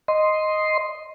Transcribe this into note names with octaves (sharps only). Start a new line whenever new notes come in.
D#5 C6